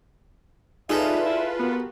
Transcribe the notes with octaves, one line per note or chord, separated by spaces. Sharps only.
D#4 F4 G#4 A4 B4 D5 E5 A#5
E4
B3 F#4 G4 A#4